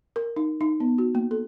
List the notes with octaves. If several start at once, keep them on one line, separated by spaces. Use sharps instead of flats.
A#4
D#4
D#4
B3
F#4
A#3
A4